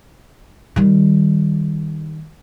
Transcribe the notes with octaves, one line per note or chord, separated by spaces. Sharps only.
D#3 G3